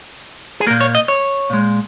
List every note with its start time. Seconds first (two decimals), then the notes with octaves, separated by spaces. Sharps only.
0.60 G#4
0.67 A#3 A#4
0.70 A#2
0.81 C#5
0.95 D#5
1.08 C#5
1.50 A#2 G#3